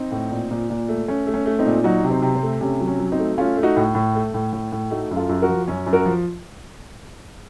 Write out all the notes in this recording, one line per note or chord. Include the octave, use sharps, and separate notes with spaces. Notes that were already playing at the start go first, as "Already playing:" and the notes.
Already playing: C4 D#4
A2
A#2
A#2
A#2
A3
A3 C#4
A3
C#4
A3
C4 D#4
A#2
F#3 D#4 F#4
C3
C4 D#4
C3
C4
A3
C3 C#4
F#3
C#4
F#3
C4 D#4
A3
A3 C#4 F4
A3
D#4 F#4
A2
A2
A3
A2
A2
A2
A3 D#4 F#4
F#2
F4 A4
F#2
F#4 A#4
F3
F#2 C#4
F#2
F#4 A#4
F3